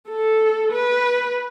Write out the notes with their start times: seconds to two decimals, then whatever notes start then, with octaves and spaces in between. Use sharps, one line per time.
0.09 A4
0.72 B4